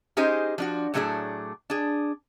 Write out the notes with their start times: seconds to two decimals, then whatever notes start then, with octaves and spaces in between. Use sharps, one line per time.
0.17 C#4 D#4 G4 G#4 C5 D#5
0.58 F3 D4 F#4
0.94 A2 F#3 A3 D4 G#4 D5
1.70 D4 G#4